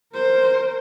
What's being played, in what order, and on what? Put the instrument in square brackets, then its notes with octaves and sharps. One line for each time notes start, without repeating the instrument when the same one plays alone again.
[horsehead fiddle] A#4 C5